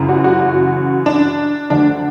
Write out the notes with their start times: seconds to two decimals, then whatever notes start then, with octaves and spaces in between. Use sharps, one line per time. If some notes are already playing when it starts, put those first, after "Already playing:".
Already playing: F#2 C#3 E3
0.09 F#4
0.24 F#4
0.40 F#4
1.06 D4
1.70 D2 D3 D4